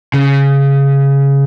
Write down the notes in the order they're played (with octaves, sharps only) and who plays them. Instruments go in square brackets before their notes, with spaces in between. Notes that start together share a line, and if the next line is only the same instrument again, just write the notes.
[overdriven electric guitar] C#3